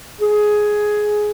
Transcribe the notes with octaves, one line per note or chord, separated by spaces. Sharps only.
G#4